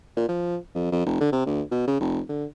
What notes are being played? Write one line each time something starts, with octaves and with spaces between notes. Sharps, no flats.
A#2
F3
F2
F2
F1
D3
C3
D2
B2
C#3
F1
D3